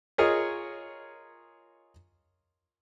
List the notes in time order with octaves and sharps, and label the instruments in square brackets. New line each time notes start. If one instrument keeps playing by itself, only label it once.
[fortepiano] F4 G#4 A#4 C#5 D#5